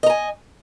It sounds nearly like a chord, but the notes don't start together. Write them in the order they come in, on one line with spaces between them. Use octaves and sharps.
D#5 A#5 G#5